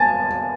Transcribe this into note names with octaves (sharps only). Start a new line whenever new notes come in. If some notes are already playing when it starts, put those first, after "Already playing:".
Already playing: G#5 A5